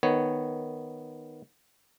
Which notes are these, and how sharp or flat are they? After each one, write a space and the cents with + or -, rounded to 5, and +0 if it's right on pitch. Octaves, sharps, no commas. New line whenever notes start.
D#3 -5 B3 +0 C#5 +0